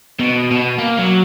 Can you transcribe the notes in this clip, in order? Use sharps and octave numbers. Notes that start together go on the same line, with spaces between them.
B2
B2
A#3
F#3